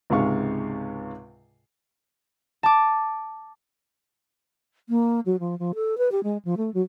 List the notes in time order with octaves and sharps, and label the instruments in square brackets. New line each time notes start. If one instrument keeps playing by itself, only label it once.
[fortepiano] C#2 G#2 C3 G#3 F5 C#6
[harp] A5 D6
[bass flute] A#3
F#3
F3
F3
A4
B4
G4
G#3
F3
A3
F#3